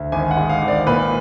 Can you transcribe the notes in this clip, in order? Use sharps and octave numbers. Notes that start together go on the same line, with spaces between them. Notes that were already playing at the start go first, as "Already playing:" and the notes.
Already playing: D2
G#1 G#5
F#5
G#2
F5
G#1
D5
A#2 B4